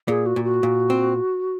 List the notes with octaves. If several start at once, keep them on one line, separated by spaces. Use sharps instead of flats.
A#2 G#4
F#4
A#2
F#4
A#2
C4